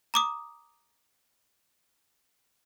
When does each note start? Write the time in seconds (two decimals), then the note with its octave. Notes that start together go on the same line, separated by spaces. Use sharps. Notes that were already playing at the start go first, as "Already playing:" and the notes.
0.14 A#5 D6 D#6